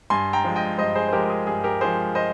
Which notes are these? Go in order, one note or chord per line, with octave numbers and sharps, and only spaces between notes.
G2 G#5 C6
G5 A#5
F3 G#3
D#5 G5
G2 C5 D#5
G#4 C5
C5
F3 G#3 G4 A#4
G#4
G2 G#4
G4 A#4
F3 G#3 G#4 C5
C5 D#5